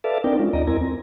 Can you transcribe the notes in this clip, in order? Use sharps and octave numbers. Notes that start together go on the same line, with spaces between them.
A4 B4 D5 E5 F5 A5
C4 D4 D#4 A#4 D5 G5
G#3 C#4 F4
D#2 D5 D#5 A#5
E2 C4 E4 A#4 G#5 A#5
C4